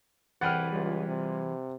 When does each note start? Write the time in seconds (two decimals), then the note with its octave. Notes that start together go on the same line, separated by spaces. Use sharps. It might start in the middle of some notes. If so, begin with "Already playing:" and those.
0.41 C2 E3 G#4 B4 F#5 G5 F6 A6
0.72 C#2 G3 F4
1.07 C3